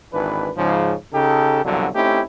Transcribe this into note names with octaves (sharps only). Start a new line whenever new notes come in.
G#1 E3 D4 B4
G#2 C#3 F3
C#3 D#4 G4 A4
C2 G2 B2 D3 F3 F#3
A3 C4 C#4 D#4 E4 G4